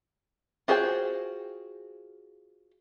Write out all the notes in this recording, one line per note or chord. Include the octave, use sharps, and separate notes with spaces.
F4 F#4 G#4 C5 G5